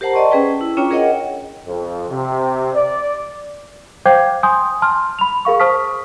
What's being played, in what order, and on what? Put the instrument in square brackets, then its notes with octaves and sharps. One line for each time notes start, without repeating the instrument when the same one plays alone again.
[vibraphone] G4 A#4 C5 F#5 A5 A#5
D5 D#5 A5 C6 C#6
C#4 G#4 B4 G5
E4
C#4 D4 F4 C#5 G5 A#5
G#4 A#4 C#5 D#5 F#5 G5
[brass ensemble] F2
C3
D5
[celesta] C5 F5 G5 D6 G6 G#6
G#5 C6 D#6 G6
A5 C6 F6
B5 F7
G#4 A#4 F5 C#6
C5 A5 C#6 D#6 F6 B6